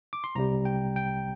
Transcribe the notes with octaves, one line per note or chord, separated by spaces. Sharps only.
D6
C6
C2 C3 G3 A#5
G5
G5